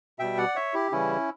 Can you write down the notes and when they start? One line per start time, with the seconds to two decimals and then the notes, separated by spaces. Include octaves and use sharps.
0.19 B2 G3 E5 G5
0.38 D5 F#5
0.55 C#5 E5
0.74 E4 G4
0.92 C#3 E3 G3 C#4 E4